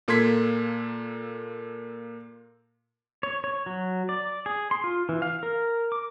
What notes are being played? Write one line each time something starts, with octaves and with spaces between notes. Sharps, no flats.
A#2 A#3 A4 C6 G#6 B6
C#5
C#5
F#3
D5
G#4
C6
F4
E3
F5
A#4
D6